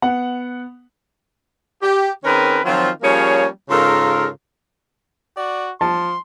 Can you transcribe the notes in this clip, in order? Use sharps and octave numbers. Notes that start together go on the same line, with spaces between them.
B3 F#5
G4
D#3 C4 C#4 G#4 A#4 B4
D#3 F3 F#3 C4 F4
F3 G3 A#3 C#4 G#4 C#5
G#2 C#3 F4 A4 A#4
F#4 D5
F3 A5 C6